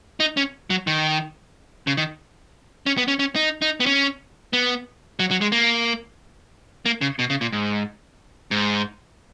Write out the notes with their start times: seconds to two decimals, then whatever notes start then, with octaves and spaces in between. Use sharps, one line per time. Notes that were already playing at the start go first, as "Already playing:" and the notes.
0.20 D#4
0.37 C#4
0.70 F#3
0.87 D#3
1.87 C#3
1.97 D#3
2.86 C#4
2.98 B3
3.08 C#4
3.19 C#4
3.36 D#4
3.62 D#4
3.80 B3
3.86 C#4
4.53 B3
5.19 F#3
5.31 F#3
5.41 G#3
5.52 A#3
6.86 A#3
7.01 C#3
7.19 B2
7.30 C#3
7.41 A#2
7.53 G#2
8.51 G#2